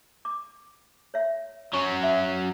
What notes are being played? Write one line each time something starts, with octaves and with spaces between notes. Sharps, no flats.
D6
C#5 E5
F#3 C#4 C#6
E5